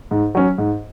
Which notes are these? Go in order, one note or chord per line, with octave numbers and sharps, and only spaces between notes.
G#2
F#3 C#4
G#2